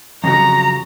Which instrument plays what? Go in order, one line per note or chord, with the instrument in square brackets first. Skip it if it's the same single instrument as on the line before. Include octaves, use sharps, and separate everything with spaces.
[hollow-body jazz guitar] F2 C#3 F#3 [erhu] A#5